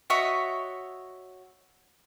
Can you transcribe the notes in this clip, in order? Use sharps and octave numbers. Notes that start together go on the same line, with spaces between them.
F#4 C#5 D#5 E5